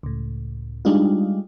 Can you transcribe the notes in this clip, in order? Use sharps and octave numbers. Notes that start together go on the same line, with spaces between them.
C#2 A2
G3 G#3 D4 D#4 F4